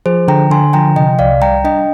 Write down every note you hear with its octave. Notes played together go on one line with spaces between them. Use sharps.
F3 G#4 C5
D3 G5 A#5
D3 G#5 C6
F3 G5 A#5
C3 D#5 G5
C2 D5 F5
G3 G5 A#5
D4 D#5 G5